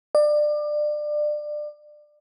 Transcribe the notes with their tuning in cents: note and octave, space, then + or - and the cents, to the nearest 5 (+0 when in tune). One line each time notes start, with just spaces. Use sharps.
D5 +25